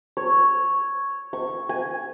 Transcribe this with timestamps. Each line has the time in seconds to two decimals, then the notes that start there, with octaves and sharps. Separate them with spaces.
0.17 C#5
1.33 C#6
1.69 G#5